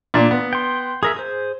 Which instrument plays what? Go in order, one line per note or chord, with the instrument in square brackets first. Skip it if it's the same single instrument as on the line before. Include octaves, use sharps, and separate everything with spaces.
[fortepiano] A#2 D4
B3
[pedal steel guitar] G5 C6
[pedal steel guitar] G#4 A#4 E5 [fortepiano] D#6
[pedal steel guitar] G#4 C5